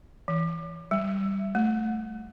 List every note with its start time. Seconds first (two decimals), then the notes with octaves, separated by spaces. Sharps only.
0.28 E3
0.91 G3
1.55 A3